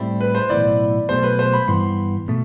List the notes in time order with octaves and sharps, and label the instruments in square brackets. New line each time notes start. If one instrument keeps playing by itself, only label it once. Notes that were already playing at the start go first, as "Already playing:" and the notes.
Already playing: [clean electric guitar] A2 G3 C4 E4
[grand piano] B4
C5
[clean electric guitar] B1 A2 E3 B3 E4 [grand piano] D5
[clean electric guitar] B1 B2 A3 [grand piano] C5
[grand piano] B4
C5
B5
[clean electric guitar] G2 E3 B3 [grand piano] C6
[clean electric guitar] B2 A3